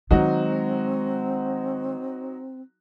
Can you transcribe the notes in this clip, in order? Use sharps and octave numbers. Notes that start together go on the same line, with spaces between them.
D#3 F#3 G#3 C4 D#4 F#4